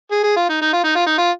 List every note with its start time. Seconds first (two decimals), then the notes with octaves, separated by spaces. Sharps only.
0.11 G#4
0.24 G#4
0.37 F4
0.49 D#4
0.61 D#4
0.73 F4
0.84 D#4
0.95 F4
1.07 D#4
1.18 F4